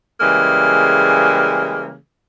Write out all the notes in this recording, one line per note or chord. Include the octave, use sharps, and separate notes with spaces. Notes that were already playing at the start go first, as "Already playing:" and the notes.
C#3 E3 G3 G#3 A#3